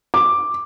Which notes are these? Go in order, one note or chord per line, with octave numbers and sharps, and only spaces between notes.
D6